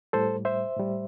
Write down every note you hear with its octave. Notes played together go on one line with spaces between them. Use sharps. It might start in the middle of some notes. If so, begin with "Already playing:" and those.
A2 G3 A4 C5
C5 E5
A2 G3